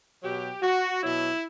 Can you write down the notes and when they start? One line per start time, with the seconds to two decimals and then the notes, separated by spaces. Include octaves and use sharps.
0.23 B2 F#3 G4
0.62 F#4
1.01 B2 F#3 E4